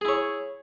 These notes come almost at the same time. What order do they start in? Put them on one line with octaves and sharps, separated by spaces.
G#4 E4 C#5